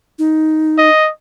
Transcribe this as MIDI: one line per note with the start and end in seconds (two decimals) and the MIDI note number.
0.19 0.89 63
0.78 1.10 75